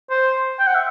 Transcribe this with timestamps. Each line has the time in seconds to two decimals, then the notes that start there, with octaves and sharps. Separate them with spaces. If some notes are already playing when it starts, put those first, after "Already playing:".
0.10 C5
0.59 G5
0.67 F#5
0.75 E5